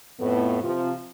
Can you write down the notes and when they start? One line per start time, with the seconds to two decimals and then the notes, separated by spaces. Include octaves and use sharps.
0.20 F2 A2 B3
0.63 C3 F3